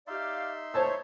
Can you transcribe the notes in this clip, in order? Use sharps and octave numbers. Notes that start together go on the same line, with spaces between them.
D#4 G4 D5 E5 F5 C6
C5 C#5 A5 E6